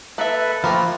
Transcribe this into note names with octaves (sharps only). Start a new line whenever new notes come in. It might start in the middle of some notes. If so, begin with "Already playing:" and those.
A#3 A4 B4 E5 B5
F3 A3 A#3 F4 A#4 E5 G5 B5